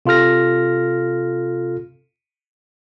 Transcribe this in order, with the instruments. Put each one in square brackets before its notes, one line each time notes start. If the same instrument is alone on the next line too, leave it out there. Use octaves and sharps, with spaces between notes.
[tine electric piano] C3 F4 A4 F6 A#6